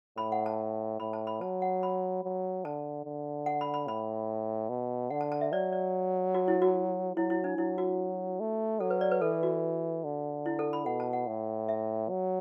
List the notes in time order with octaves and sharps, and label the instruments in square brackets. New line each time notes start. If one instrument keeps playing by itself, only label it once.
[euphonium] A2 [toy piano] B5
[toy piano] F#5
A5
[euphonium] A2 [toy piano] B5
[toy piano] A5
B5
[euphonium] F#3 [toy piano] A5
[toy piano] F#5
B5
[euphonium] F#3
[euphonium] D3 [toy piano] A5
[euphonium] D3
[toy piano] F#5
B5
B5
[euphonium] A2 [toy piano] B5
[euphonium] B2
[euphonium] D3 [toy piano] F#5
[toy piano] A5
A5
E5
[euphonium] F#3 [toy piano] D5
[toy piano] D5
F#4
E4
F#4
[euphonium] F#3 [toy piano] E4
[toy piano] E4
D4
[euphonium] F#3 [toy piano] E4
[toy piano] F#4
[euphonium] A3
[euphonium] F#3 [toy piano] A4
[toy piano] B4
D5
B4
[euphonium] E3 [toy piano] A4
[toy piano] F#4
[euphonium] D3
[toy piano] E4
A4
B5
[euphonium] B2 [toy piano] F#5
[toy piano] A5
F#5
[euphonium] A2
[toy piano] E5
[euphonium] F#3